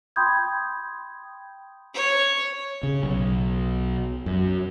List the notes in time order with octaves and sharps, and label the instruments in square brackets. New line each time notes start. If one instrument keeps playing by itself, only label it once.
[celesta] G5 B5 C6 D#6 G6 G#6
[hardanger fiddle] C#5
[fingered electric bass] C#3
B1
F#2